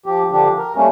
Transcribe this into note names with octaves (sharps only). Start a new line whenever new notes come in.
F3 G4
D3 F3 D4 G4
A#4
G3 A3 A#3 C#4